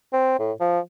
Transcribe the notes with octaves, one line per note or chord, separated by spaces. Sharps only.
C4
A2
F3